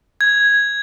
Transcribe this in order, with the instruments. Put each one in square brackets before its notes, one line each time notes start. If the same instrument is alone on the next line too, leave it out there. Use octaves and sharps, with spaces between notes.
[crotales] G#6